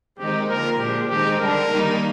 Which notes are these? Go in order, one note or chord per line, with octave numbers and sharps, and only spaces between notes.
D#3 G#3 C4 D#4 G4
D3 F3 A#3 A#4
A#2 F3 G#3 D4 G4
D#3 G#3 C4 D#4 G4
D3 G3 D4 A#4
D#3 G3 A#3 D#4